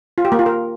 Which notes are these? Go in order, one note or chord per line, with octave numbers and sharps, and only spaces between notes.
F4
G4
A#3
F4
A#4